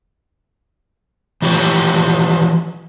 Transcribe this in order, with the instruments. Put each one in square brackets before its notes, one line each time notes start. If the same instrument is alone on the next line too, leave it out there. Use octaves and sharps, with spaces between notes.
[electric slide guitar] E3 F3 G4 C#5